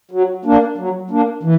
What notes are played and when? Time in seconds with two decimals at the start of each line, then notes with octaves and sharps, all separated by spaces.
0.11 F#3
0.45 A#3 D4
0.78 F#3
1.10 A#3 D4
1.43 E3